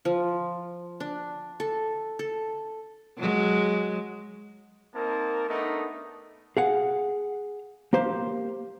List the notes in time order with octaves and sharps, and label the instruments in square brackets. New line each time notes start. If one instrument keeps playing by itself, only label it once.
[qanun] F3
D4
A4
A4
[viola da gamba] F#3 G#3
[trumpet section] A#3 C4 D#4 A#4 A5
A3 B3 D4 D#4 A#4
[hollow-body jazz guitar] G#4 F5 F#5
A#3 G4 C5 F5